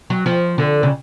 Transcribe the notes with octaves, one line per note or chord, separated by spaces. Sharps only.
F#3
F3
D3
C#3